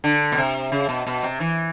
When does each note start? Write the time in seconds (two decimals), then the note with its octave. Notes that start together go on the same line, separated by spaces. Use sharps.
0.04 D3
0.32 B2
0.37 C3
0.72 C#3
0.89 B2
1.07 B2
1.23 C3
1.40 E3